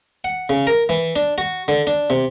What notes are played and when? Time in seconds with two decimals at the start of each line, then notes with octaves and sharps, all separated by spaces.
0.24 F#5
0.49 C#3
0.67 A#4
0.89 E3
1.16 D4
1.38 F#4
1.68 D3
1.87 D4
2.10 C3